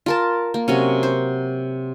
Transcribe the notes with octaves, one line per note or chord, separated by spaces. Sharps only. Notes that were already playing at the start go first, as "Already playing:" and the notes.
F4 A#4 A5
A#3
C3 F#3 C#4
C5